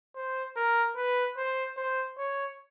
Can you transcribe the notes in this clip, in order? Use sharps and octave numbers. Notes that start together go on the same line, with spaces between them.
C5
A#4
B4
C5
C5
C#5